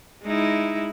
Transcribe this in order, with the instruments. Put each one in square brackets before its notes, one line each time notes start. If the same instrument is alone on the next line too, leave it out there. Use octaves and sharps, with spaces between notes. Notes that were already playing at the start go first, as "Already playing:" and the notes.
[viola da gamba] G#3 D#4 E4